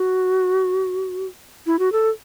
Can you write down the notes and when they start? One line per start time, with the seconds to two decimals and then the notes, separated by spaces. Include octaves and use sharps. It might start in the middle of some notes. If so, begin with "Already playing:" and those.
Already playing: F#4
1.66 E4
1.79 F#4
1.92 A4